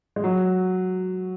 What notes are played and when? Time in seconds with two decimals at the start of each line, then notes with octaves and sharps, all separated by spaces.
0.16 G#3
0.24 F#3